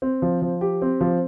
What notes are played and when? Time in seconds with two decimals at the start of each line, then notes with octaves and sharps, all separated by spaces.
0.02 C4
0.22 F3
0.42 F3
0.61 G4
0.82 C4
1.01 F3